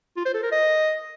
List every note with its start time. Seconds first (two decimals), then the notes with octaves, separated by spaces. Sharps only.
0.17 F4
0.25 C5
0.34 A4
0.43 A#4
0.52 D#5